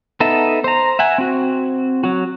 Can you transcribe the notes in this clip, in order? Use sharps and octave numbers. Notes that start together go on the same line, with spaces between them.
B3 D#4 A4 E5
C5 A#5
E5 F#5 G#5
C4 F#4
F#3 F#4